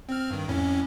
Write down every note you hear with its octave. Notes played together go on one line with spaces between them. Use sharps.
C4 F6
G2 D#3
F2 A2 C#4